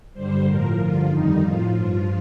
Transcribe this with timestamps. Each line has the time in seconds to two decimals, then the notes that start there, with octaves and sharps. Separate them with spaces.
0.14 G2 D3 G3 C5
0.46 A2 F3 A#4
0.77 G2 D3 F3 F4
1.09 F2 D#3 G3 D#4
1.40 A2 F3 F4
1.73 G2 F3